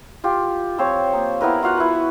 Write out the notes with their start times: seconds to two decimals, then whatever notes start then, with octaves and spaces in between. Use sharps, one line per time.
0.24 F4 G4
0.78 F3 C4 C5 C#5
1.13 A#3 D#6
1.41 B3 E4 A#4 B4
1.62 F4 F#4 F5 F#5
1.77 E4 B4